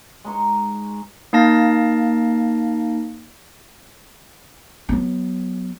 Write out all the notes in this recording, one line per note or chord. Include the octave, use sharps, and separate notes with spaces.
G#3 D#4 C#6
A#3 D#4 F5 A5 A#6
F#3 B3